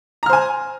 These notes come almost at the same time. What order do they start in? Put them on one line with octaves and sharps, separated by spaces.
A#5 F6 C5 G#5